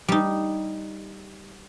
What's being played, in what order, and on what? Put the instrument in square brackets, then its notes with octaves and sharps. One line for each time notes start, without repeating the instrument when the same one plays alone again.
[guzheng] G3 D#4